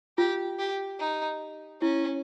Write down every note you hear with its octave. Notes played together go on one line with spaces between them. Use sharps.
F4 G4
G4
D#4
C#4 E4